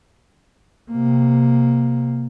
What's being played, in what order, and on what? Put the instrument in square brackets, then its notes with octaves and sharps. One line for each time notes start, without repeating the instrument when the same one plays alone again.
[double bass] C3 A#3